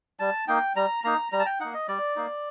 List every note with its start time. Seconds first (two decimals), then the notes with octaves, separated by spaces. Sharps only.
0.20 G3 A5
0.48 A#3 D#4 G5
0.76 G3 A#5
1.04 A#3 D#4 A#5
1.32 G3 A#5
1.39 A5
1.46 G5
1.60 A#3 D#4 F#5
1.74 D#5
1.88 G3 D5
2.16 A#3 D#4